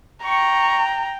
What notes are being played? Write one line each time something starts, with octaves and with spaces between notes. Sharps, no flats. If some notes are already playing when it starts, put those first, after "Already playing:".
G5 A#5 C#6